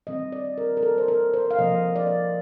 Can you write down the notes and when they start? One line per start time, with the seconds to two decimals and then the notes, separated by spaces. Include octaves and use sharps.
0.07 D#3 G3 C4 D#5
0.32 D5
0.58 A#4
0.77 A#4
0.83 A4
0.98 C5
1.08 A#4
1.34 C5
1.51 F5
1.58 C3 F3 A#3 D#5
1.96 D5